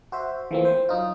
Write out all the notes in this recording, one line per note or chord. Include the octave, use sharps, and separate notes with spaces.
F#4 C5 E5
E3 F3 A3 A#3 C4
C5
F#3 D#4 F4